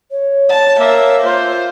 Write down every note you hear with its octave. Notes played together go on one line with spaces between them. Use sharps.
C#5
A5
A#3 E5
F4 C5